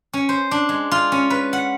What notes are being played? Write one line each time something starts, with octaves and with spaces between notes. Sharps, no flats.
C#4
C5
D4
G#3
F4
C#4
B4
F#5